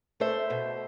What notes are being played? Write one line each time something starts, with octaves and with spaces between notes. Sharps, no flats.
A3 C5 E5
B2